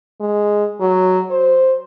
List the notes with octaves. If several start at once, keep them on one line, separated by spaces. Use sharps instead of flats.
G#3
F#3
C5